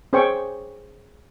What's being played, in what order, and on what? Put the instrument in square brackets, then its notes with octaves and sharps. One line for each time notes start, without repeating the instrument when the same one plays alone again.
[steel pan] C#4 G#4 C5 C#5 G5 C#6